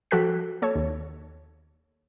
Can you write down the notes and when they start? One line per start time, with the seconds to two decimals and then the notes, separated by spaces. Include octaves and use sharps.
0.11 F3 F#4 A4 G5 F#6 B6
0.62 A#3 A4 C#5
0.75 D#2